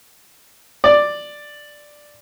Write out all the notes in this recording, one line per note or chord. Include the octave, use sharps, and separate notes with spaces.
D5